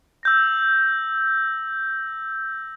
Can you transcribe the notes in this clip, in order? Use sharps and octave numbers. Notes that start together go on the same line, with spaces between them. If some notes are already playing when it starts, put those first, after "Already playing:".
E6 G6 A#6